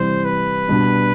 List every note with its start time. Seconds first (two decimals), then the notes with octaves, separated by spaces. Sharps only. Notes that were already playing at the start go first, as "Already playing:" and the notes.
Already playing: C3 E3 G3 C5
0.25 B4
0.68 B2 G3 B3 D4